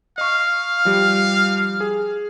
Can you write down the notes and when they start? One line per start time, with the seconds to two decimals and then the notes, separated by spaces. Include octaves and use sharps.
0.18 D#5 F5 C#6
0.85 F3 G3 G4
1.81 G#4